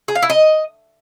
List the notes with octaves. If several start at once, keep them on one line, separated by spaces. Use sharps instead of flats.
G#4
F5
E4
D#5